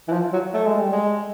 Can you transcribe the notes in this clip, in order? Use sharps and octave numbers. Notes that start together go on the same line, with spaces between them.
E3
F3
F#3
A3
G#3
G3
G#3